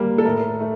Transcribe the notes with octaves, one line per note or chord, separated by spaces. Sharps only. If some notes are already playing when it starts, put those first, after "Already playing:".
Already playing: G3 A#3
A4
A2 A#4
A3